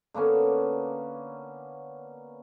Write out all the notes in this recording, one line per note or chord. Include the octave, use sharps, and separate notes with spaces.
D3 A#3 B3 C#4